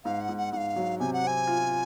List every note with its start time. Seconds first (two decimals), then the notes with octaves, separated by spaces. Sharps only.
0.05 G#2 F5
0.21 F#5
0.29 G#2
0.37 F#5
0.53 G#2 F#5
0.57 F5
0.76 F#3
1.00 C3 G#5
1.13 F#5
1.24 C4 G#5
1.47 F4